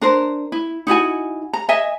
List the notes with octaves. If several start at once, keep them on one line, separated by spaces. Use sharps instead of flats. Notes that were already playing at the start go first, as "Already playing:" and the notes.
D4 A#4 C5
E4
D#4 E4 F#4 G#5
A#5
D#5 E5 G#5